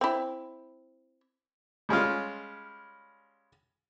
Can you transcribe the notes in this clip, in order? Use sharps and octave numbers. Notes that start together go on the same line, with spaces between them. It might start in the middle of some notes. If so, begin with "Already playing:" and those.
C4 E4
G3 G#3 C#4 F4